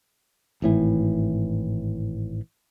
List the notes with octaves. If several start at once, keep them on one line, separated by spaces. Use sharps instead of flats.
G#1 A2 E3